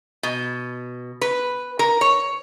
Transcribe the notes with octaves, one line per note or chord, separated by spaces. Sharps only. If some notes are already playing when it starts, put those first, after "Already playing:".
B2
B4
A#4
C#5